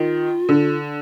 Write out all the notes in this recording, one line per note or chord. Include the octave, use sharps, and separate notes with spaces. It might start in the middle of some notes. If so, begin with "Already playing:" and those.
Already playing: D#3 F4
D3